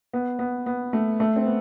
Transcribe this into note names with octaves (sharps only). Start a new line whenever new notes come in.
B3
B3
B3
A3
A3
C4
B3